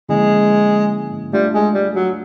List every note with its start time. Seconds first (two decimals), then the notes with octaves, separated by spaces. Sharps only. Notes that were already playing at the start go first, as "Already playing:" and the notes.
0.09 D3 F3 G#3 A#3 C#4 E4
1.33 G3 A3 D4 F4
1.54 G#3
1.74 G3
1.95 F#3